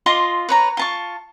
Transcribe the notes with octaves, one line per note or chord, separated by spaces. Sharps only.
F4 D#5 C6 D6
B4 C#5 A#5
F4 A5 C#6